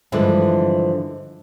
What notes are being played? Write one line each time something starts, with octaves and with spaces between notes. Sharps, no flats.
G2 D3 E3 F3 G#3